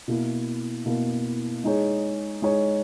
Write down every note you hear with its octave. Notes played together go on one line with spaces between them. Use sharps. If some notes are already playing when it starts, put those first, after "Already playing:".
B2 A#3 E4
B2 A#3 E4
G#3 D#4 G#4 C#5
G#3 D#4 G#4 C#5